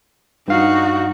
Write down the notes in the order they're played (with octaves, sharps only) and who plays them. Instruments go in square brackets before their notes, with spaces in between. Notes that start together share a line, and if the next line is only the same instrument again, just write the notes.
[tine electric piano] G2 F5 [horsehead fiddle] D#4 F#4